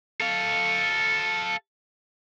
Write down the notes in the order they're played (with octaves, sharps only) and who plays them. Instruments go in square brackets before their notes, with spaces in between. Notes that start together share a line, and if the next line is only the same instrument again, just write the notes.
[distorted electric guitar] A4 F5